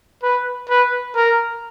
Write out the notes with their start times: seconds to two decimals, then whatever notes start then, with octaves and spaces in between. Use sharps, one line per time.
0.23 B4
0.69 B4
1.16 A#4